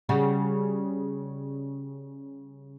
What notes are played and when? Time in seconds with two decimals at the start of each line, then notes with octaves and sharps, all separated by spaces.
0.09 C#3 G3 F#4